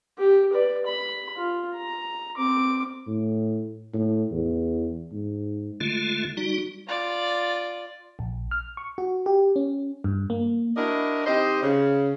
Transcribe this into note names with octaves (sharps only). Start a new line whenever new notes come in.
G4
B4 D5
B5
F4
A#5
C4 D6
A2
A2
E2
G#2
D3 G#3 A3 F4
G3 D#4 F#4
F4 D5
A#1
F6
C#6
F#4
G4
C#4
G2
A#3
D4 E4 F#4 A#4 D5 D#5
D#3 C4 G4 C5 D#5
C#3